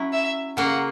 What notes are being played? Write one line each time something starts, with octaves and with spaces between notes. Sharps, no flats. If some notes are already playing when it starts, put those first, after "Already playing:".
Already playing: F#3 C#4 E4
E5
C#3 F#3 A#3 F#5